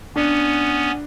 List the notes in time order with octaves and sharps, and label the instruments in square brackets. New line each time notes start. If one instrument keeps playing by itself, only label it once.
[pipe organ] B3 C#4 [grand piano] D4